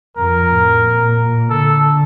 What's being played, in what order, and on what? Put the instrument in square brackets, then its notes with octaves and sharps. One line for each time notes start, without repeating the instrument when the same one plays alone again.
[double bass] F2 [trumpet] A#4
[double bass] A2
A#2
[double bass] D3 [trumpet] A4